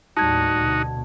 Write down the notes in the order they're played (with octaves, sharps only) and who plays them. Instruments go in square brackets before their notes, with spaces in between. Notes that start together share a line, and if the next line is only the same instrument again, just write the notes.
[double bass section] D#2 A2 G3 [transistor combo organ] D#4 F#4 [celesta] A5 G#6
[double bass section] D2 B2